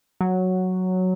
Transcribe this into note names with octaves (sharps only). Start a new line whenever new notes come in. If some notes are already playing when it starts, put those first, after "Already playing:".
F#3